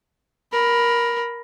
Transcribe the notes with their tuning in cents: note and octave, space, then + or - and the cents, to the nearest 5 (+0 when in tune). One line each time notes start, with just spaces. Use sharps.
A#4 +15 B5 +0